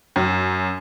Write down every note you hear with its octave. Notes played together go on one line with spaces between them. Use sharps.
F#2